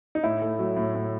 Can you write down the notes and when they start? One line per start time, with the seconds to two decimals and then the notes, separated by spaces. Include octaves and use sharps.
0.15 D#4
0.23 A2 E4
0.42 A3
0.59 F#3
0.76 A2
0.95 A2